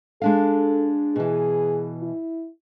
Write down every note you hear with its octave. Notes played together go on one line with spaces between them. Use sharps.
G#3 D4 A4 F5
B2 E3 G#4
E4